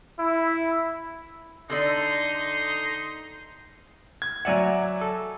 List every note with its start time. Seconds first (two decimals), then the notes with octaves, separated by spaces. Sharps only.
0.19 E4
1.70 D3 D#4 A4 D5 D#5 C6
4.22 G#6
4.45 F#3 D5 E5 F#5 G#5 A#5
5.01 A4